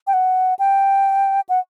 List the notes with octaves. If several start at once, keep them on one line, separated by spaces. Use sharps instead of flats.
G5
F#5
G5
F#5